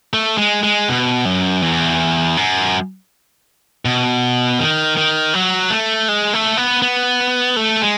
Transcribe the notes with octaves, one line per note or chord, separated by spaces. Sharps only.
A3
G#3
G#3
B2
F#2
E2
F#2
B2
D#3
D#3
F#3
A3
G#3
A3
B3
B3
A3
G#3